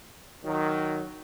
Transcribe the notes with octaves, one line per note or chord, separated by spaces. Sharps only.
D#3 F#3